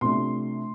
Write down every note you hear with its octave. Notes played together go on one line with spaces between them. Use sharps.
C3 F3 A3 D4 C6